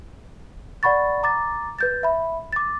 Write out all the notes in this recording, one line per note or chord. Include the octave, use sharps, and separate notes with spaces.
D5 F#5 B5 C#6 A6
A#5 D6 A6
B4 G6 A6
E5 B5
D6 A6